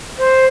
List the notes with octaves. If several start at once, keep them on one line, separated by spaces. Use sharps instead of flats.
C5